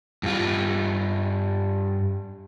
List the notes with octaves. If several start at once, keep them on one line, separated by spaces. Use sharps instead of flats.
G2 F4